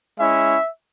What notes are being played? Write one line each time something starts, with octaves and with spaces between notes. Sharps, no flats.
G#3 C#4 E4 E5